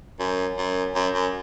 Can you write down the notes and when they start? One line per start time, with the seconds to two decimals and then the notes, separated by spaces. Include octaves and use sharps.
0.20 F#2
0.58 F#2
0.95 F#2
1.14 F#2